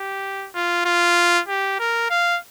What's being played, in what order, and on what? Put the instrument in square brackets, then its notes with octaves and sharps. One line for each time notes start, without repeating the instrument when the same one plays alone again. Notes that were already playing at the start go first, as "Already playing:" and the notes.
Already playing: [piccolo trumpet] G4
F4
F4
G4
A#4
F5